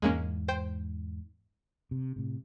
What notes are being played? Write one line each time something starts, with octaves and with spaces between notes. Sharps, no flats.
E2 G#2 G#3 A#3 C#4
C5 G5
C3
A2 C3